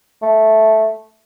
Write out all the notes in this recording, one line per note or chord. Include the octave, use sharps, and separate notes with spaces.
A3